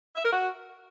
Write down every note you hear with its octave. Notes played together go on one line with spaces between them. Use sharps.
E5
A#4
F#4